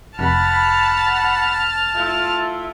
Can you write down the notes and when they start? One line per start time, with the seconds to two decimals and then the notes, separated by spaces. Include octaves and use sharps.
0.19 F1 F#5 A5 B5 F6
1.95 A3 E4 F4